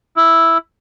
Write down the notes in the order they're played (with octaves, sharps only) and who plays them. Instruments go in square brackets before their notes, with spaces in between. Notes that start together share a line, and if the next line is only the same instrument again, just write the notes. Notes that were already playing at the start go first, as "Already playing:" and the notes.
[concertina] E4